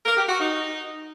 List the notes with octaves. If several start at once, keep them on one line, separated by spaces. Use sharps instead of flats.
A#4
G4
F#4
D#4